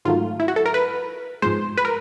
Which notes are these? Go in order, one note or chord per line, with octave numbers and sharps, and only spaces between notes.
G#2 D#3 F#3 A3 F4
E4
F#4
A4
A#4
B4
G#2 F3 G#3 C5
B4
A#4